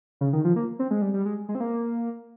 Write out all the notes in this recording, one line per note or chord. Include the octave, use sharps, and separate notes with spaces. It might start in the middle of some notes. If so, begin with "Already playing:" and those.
C#3
D#3
F3
A#3
C4
G#3
G3
G3
G#3
G#3
C4
A#3